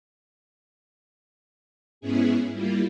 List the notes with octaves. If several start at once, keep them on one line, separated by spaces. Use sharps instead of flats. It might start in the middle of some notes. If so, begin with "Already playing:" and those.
G#2 B3 C#4 E4 G#4
G3 A#3 E4 F4